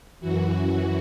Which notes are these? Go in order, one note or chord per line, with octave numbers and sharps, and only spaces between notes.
F#2 E3 F#4